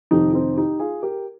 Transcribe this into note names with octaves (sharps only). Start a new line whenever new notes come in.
F1 F2 D#3 D#4 G4
C4 D#4
D#4 G4
F4 G#4
G4 A#4